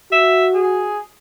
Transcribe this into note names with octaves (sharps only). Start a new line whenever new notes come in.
F#4 E5
G#4